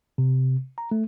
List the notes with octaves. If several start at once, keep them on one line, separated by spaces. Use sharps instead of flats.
C3
A#5
A3